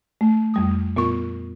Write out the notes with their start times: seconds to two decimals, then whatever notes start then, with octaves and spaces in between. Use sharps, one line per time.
0.21 A3
0.54 F2 G3 D#6
0.96 A#2 B3 F4 C#6